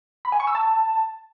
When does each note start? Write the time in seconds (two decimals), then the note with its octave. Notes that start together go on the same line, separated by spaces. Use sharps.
0.25 B5
0.32 G#5
0.40 C#6
0.47 E6
0.55 A5